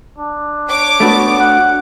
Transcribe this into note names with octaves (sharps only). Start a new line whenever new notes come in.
D4
C#5 D6
A3 B3 D4 F#4
F#5